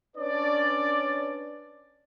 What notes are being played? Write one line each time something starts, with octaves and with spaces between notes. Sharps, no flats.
C#4 D4 B4 C#5 D5